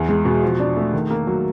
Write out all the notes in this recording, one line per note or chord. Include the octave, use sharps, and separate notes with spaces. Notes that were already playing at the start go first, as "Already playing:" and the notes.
Already playing: E2
G#3
B2
F3
D4
A3
D#3
A#3
F#3